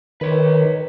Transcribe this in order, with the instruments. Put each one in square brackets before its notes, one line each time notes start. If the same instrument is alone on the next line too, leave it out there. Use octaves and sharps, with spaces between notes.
[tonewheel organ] D#3 [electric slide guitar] B4 C#5